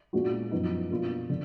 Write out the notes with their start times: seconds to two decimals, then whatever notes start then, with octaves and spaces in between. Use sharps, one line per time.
0.13 A#2 G#3 B3 D4 F#4
0.51 F#2 F3 B3 D#4
0.91 B2 A#3 D4 F4
1.30 D3